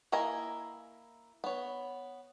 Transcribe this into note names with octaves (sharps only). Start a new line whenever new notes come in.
A#3 E4 D#5 G#5 A#5
B3 C#5